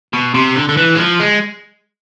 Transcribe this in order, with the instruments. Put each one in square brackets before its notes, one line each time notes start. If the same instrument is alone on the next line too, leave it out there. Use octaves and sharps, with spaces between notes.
[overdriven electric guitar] B2
C3
D3
D3
E3
G#3
F3
G#3